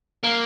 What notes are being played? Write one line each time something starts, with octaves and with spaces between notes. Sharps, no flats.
A#3